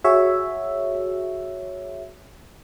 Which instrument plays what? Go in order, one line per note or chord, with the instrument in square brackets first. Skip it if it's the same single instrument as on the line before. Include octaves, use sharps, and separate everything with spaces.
[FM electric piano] F#4 G#4 C#5 E5